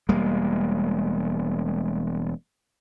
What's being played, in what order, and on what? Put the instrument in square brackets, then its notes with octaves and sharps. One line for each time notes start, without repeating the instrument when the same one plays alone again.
[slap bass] E1 G3 G#3 A#3